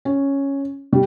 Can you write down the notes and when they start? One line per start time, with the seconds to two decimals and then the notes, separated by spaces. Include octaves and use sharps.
0.05 C#4
0.93 G3